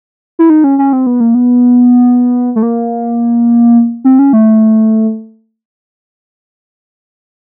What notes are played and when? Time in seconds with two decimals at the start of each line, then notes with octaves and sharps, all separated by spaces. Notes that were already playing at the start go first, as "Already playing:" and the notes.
0.39 E4
0.50 D#4
0.64 C#4
0.79 C#4
0.93 C4
1.07 B3
1.20 A#3
1.35 B3
2.56 A3
2.63 A#3
4.05 C4
4.19 C#4
4.33 A3